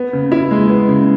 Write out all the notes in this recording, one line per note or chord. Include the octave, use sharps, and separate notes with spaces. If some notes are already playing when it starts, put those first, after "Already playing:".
Already playing: B3
C#3
E4
G#3
B3
C#3